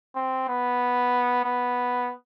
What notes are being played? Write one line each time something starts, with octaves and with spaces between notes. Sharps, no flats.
C4
B3
B3